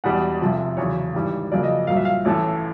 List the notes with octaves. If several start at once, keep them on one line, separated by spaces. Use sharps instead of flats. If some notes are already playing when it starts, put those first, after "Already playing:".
E1 E2 B2 G3 F#5
F1 F2 C3 F3
F1 E2 C#3 F#3 C#5
G#1 G#2 E3 G3
F2 C#3 F#3 A#3 D5
D#5
C2 A#2 F#3 F5
E5
F5
A1 A2 E3 A3